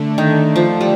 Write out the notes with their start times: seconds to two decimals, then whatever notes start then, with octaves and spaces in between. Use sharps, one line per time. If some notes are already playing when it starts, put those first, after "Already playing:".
Already playing: D3 A3 D4
0.18 D#3
0.56 F3
0.81 G3